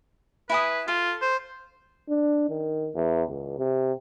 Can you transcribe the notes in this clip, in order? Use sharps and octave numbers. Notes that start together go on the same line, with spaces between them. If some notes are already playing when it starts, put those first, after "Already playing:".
E4 B4 G#5 D#6
F4 A4
C5
D4
D#3
E2
C#2
C3